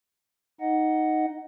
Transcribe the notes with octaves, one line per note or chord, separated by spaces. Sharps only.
D#4 D#5 F#5